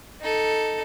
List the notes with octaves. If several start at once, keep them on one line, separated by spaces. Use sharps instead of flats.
D#4 A4